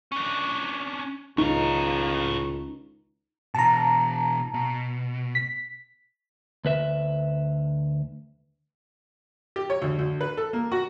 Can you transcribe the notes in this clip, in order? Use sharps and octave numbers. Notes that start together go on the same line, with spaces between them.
C#4 D4
C#2 A2 D#4 F5
B2 E3 A5 A#5
B2
B6
D2 B4 E5
G4
C#5
D2
D2
B4
A4
A#3
F#4